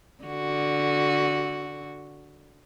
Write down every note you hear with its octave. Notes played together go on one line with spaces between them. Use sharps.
D3 F#4